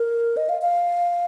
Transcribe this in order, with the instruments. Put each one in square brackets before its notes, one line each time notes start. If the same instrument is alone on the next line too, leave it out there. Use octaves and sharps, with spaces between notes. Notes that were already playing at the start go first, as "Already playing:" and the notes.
Already playing: [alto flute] A#4
D#5
F5
F5